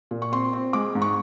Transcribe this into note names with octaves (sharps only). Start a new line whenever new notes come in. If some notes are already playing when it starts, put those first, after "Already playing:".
A#2
C#6
C4 C6
C4
G#3 D6
G#2
C#6